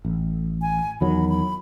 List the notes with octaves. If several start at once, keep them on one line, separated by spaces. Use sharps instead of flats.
A1
G#5
E2 D#3 F#3 B5
B5